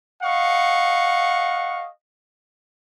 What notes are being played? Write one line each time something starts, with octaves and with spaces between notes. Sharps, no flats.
D#5 F5 F#5 C#6